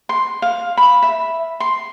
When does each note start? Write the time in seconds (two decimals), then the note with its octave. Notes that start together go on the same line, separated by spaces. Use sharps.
0.09 C6
0.42 F5
0.77 B5
1.02 E5
1.60 C6